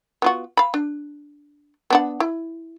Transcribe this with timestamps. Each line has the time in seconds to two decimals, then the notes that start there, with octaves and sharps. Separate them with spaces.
0.22 B3 F4 F#4
0.57 F5 B5
0.74 D4
1.90 B3 D4 F#5
2.20 E4